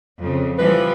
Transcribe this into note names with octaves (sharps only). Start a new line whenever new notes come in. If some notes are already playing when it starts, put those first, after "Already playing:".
F2 C#3
E3 F3 G3 B4